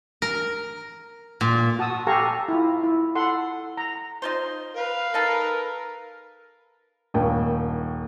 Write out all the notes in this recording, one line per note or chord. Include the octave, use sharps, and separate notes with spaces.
A#4
A#2
F#4 A5 D#6 E6
G4 A4 F5 G#5 A#5 C#6
E4 F4
E4
A4 F#5 C6
A#5
D#4 F4 C5
B4 F5
D#4 A4 A#4
D#1 D#2 G5